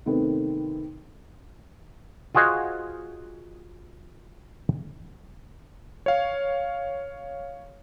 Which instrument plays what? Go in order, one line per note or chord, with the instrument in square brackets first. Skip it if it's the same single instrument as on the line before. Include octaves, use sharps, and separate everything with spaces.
[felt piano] C3 D#3 A3 B3 C4
[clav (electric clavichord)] F4 F#4 G#4 C5 D#5 F#5
[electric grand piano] C#5 F5